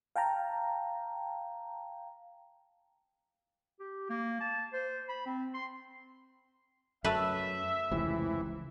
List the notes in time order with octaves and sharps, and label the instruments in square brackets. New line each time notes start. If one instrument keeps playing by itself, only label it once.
[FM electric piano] F5 G5 A5 A#5
[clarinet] G4
A#3
A5
C5
B5
C4
C6
[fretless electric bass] F#2 [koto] A3 B4 [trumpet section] E5
[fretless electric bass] F1 C#2 C3 [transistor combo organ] E3